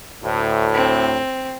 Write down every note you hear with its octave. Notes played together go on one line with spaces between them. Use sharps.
D2 A2
C4